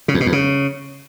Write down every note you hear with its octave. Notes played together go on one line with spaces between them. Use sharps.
C#3
E2
B2
E2
C#3